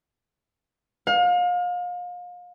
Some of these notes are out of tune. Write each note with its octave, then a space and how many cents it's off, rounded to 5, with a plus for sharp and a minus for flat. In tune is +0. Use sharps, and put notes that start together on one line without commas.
F5 +35